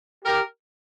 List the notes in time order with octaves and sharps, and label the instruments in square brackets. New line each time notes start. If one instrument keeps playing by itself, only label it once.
[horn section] G4 A#4